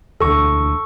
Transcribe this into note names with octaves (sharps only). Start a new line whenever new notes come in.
E1 D2 A4 C#6